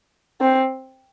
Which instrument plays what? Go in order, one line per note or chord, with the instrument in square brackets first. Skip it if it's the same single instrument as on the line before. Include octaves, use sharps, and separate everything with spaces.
[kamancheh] C4